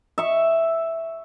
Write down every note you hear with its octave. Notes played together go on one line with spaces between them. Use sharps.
E5 C#6